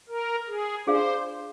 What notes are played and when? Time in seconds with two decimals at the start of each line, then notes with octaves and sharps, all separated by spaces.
0.09 A#4
0.48 G#4
0.86 D4 F4 G#4 C5 D5 F5